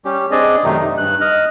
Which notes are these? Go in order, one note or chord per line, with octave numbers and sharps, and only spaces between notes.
G3 C#4 G4
C4 D4 G#4 D5 D#5
F#2 C3 D#3 A3 D#4
D#4
G2 F#6
D#5 F6 F#6